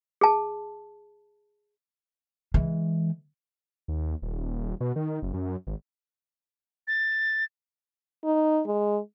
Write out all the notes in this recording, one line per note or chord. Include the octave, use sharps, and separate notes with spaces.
G#4 A5
E3 G#3
D#2
D#1
B2
D#3
F#1
F#2
G#1
A6
D#4
G#3